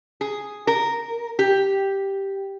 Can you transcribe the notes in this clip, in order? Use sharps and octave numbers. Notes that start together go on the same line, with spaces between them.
G#4
A#4
G4